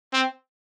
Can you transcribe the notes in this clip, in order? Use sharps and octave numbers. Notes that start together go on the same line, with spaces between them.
C4